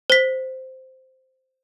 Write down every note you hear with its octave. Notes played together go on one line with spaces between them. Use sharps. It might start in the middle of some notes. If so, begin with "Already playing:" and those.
C5 B6